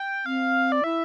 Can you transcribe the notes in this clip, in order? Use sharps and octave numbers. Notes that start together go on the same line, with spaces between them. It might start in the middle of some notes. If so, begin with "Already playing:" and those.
Already playing: G5
C4 F5
D5
E4 E5